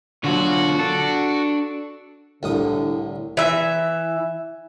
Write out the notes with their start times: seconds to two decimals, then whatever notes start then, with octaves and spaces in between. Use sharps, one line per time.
0.24 B2 D3 F#3 F4 F#4
0.79 D4 A4
2.43 C2 A2 D3 D#6
3.37 E3 E5